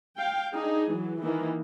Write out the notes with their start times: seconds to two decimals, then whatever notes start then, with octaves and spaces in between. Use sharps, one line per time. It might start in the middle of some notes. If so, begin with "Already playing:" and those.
0.15 F5 G5
0.53 D4 D#4 G#4
0.92 E3 F#3
1.20 D#3 E3 A#3